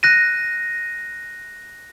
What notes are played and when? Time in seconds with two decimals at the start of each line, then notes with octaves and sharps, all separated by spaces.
0.03 F#6 A#6 D#7